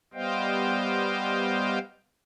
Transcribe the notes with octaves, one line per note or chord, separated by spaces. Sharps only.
G3 B3 C5 D#5 F5 G5